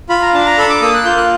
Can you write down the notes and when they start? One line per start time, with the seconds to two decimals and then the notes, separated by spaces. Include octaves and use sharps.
0.09 F4 B5
0.22 A#5
0.33 D4 A5
0.46 A#5
0.58 A4 B5
0.70 D6
0.82 A#3 D#6
0.94 F#6
1.05 F4 G6
1.17 F#6